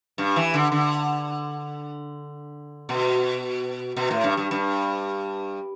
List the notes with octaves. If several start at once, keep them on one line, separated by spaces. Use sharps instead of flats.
G2
E3
D3
D3
B2
B2
A2
G2
G2
G2